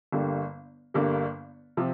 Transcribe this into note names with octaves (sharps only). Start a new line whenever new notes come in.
G1 G2 D3 G3 A#3
G1 G2 D3 G3 A#3
C3 F3